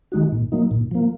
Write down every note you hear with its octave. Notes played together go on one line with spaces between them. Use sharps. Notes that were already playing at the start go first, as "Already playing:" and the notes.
D#3 G#3 D#4 F#4
A#2
F#3 A#3 D#4
A#2
F3 A#3